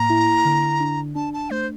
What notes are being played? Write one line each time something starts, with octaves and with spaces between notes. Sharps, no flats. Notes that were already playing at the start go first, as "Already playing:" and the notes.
Already playing: A2 A#3 A#5
E4
D3
D4
D4 A5
A5
A3 C5